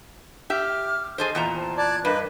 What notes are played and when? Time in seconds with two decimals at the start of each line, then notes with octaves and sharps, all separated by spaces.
0.50 G4 E5 D6 F6
1.18 G#4 A4 C5 D#5
1.35 E2 A#2 A#5
1.56 C5 G5 A5
1.77 D5 A5 F#6 G#6
2.05 G2 A#4 B4 D#5